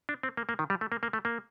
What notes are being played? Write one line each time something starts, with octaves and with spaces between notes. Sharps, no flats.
D4
C4
A#3
A#3
D#3
G3
A3
A#3
A#3
A3
A#3